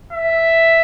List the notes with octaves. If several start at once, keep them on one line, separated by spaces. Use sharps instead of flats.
E5